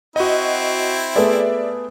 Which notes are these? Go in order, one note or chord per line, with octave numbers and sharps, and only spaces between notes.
C4 E4 F#4 D#5
A3 B3 G#4 D5 E5